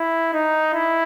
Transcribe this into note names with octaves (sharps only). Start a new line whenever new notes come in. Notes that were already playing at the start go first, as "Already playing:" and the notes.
Already playing: E4
D#4
E4